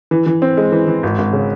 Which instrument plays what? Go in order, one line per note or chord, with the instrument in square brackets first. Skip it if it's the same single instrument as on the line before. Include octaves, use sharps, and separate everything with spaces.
[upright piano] E3
E3
C4
G#3
E3
E3
G#1
G#1
C#3